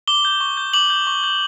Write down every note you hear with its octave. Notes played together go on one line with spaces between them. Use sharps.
D6 G7
G6
C#6
G6
D6 F#7
G6
C#6
G6